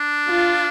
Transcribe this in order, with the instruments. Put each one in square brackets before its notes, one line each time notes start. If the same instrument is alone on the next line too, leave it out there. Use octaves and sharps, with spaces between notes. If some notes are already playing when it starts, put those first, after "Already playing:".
Already playing: [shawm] D4
[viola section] F4